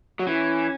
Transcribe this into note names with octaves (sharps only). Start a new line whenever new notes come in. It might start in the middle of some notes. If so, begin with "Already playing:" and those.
F#3
E3 C#4